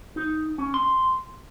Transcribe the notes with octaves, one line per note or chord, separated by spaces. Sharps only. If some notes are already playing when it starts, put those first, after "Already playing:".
D#4
C#4
C6